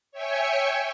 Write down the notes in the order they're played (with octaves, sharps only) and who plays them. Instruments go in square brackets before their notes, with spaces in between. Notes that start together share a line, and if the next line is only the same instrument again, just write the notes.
[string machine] C#5 E5 G5 G#5 C#6